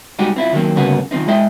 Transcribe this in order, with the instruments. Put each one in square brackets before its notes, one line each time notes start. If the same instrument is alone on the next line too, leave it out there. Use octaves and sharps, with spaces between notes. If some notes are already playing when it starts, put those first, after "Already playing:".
[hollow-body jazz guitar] G3 G#3 D#4 F#4 G4
C4 E4 F4
D#3 F#3 A#3 C4
D2 G2 C#3 A#3 B3 F#4
D#3 F3 C4 D#4
G#3 E4 G#4 D#5 E5 G5